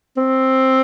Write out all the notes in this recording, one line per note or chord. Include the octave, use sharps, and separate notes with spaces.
C4